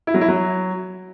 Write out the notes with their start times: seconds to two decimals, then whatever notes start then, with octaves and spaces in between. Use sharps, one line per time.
0.07 E4
0.14 F#3
0.21 E4
0.28 F#3